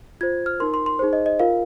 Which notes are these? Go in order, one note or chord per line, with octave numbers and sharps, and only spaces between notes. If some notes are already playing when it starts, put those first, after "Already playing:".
F4 C5 G#6
F6
D#4 A#4 C6
C6
C6
D#4 G#4 C5
D#5
D#5
F4 A#4 F5